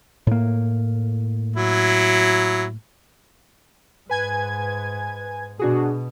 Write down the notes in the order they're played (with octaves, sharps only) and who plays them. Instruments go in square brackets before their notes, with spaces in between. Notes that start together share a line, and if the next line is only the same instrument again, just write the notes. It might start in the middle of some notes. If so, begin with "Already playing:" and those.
[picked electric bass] A2 A#3
[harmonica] F#3 E4
[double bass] G#2 [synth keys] B4 G#5 G#6
[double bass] B2 [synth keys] D4 F#4 G#4